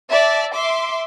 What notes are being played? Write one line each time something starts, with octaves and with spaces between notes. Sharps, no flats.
D5 E5 A5
E5 C6 D6